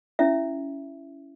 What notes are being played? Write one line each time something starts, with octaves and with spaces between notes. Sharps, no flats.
C#4 E4 E5